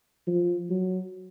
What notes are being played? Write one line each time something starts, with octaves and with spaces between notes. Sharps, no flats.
F3
F#3